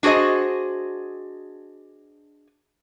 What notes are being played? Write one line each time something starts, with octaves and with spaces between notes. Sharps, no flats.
D4 F#4 G#4 C5 D#5